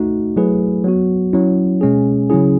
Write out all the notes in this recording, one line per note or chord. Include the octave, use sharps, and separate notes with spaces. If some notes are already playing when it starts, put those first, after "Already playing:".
Already playing: A3 D#4 F#4
F#3 A3 E4 G#4 B4
F#3 B3 F#4
F#3 C#4 E4
B2 G#3 C#4 G#4
C#3 F#3 C#4 E4 G#4